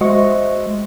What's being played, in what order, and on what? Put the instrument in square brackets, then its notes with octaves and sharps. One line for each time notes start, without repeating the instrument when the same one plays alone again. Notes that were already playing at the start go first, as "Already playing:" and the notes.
[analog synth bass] G#3 [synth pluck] F#4 D#5 C#6 [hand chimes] C5 E5